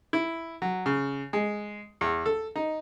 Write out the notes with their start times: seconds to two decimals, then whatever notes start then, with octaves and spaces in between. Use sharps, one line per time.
0.13 E4
0.62 F#3
0.86 C#3
1.33 G#3
2.01 E2
2.26 A4
2.56 D#4